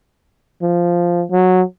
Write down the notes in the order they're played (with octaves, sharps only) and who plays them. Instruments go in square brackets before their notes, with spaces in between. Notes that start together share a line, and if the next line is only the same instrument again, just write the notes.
[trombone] F3
F#3